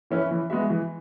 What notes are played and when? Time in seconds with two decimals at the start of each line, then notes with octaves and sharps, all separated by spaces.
0.11 E3 C#4 E4 B4
0.31 E3
0.50 G#3 B3 F#4 E5
0.70 E3